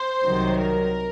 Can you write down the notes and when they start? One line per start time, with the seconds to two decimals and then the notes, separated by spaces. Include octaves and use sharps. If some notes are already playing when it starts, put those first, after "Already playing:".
Already playing: C5
0.25 C2 C3 D#3 F#3
0.59 A#4